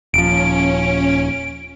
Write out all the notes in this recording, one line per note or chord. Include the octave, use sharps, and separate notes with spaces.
D#1 F3 C#4 D7